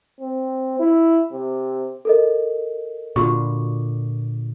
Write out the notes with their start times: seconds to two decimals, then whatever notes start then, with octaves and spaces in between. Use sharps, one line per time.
0.20 C4
0.79 E4
1.32 C3
2.05 A4 A#4 D#5
3.16 A#2 D3 F4 F#4 C#6